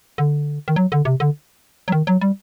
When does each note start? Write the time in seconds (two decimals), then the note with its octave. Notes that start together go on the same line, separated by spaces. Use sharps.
0.18 D3
0.68 D#3
0.76 F#3
0.92 D3
1.05 C3
1.20 D3
1.88 F#3
1.92 D#3
2.07 F#3
2.21 G3